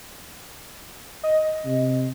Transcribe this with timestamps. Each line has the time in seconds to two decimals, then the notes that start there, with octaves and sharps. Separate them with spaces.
1.23 D#5
1.65 C3